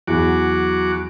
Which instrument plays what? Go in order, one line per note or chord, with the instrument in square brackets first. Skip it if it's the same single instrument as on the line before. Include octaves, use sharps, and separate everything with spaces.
[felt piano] E2 [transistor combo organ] F#3 F#4 D6